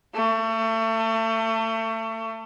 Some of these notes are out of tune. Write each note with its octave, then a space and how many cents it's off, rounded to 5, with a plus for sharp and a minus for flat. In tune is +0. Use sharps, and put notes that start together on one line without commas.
A3 +30